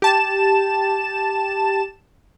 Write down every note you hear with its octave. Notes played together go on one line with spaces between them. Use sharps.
G4 A5 E7